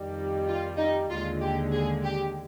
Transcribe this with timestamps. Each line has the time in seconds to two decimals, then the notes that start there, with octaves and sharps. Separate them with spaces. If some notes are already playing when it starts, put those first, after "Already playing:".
Already playing: F2 D#3 G3
0.47 F4
0.78 D#4
1.09 D#2 D3 G#3 F4
1.41 G4
1.73 G#4
2.04 G4